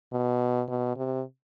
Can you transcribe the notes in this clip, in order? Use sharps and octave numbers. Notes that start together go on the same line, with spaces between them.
B2
B2
C3